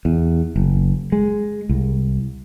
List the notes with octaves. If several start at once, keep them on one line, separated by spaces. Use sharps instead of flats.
E2
F#1
G#3
C2